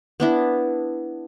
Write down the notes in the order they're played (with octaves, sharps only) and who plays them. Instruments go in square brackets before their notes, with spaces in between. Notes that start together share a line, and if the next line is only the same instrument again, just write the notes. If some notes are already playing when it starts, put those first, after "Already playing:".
[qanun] B3 D4 E4